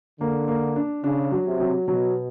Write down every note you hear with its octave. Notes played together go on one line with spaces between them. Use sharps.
D3 A#3
A#3
D4
C#3 D4
F#3
C3
F#3
B2 F#3